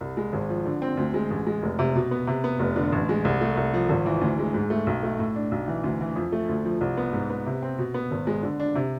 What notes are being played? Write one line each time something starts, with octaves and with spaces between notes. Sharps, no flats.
C2
G#3
G#1
F3
D3
C4
D2
G#3
A1
G#3
F1
C3
B2
B3
C3
B3
F1
D3
A1
G#3
C2
A3
C2
F3
G#1
E3
D2
G#3
G#2
A3
B1
A3
A2
D4
B1
E3
D2
E3
F2
A3
D2
F3
C2
B3
G#2
B3
C3
C4
B2
B3
G#1
G#3
D3
D4
C3